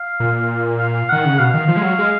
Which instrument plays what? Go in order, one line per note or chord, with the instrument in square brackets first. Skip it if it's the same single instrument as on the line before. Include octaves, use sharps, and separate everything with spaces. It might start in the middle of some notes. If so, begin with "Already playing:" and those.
Already playing: [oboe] F5
[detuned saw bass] A#2
[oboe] F5
[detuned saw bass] D#3 [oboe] F#5
[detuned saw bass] C#3
[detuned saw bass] B2 [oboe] F5
[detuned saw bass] D#3
F3
G#3
F#3
G#3